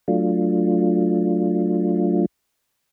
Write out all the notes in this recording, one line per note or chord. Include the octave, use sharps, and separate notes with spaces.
F#3 A3 D4 F4